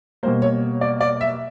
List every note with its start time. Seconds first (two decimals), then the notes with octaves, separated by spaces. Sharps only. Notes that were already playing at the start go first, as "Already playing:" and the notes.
0.23 B2 G3 A#3 C5
0.42 C#5
0.81 D5
1.01 D5
1.21 E5